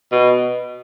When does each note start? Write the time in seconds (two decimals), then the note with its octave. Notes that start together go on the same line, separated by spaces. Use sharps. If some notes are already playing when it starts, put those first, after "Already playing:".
0.12 B2